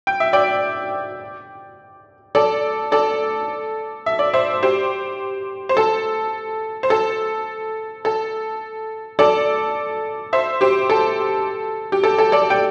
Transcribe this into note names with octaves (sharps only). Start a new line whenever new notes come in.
G5
E5
D5 G5
A4 D5
A4 D5
E5
D5
C5 E5
G4 C5
C5
A4
C5
A4
A4
A4 D5
C5 E5
G4 C5
A4
G4
A4
A4
A4 D5
G5